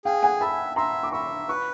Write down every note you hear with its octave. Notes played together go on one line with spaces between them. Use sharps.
G#4 F5 G5
F#5 G#5
E5 A5 B5
E5 A#5 C6
D6
E5 B5 C#6
B4 B5 C#6